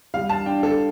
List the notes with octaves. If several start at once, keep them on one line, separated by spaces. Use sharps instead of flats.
G3 F5
A5
D4 G5
A4